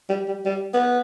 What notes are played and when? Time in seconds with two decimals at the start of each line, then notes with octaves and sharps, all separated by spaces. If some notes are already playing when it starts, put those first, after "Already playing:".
0.10 G3
0.28 G3
0.46 G3
0.74 B3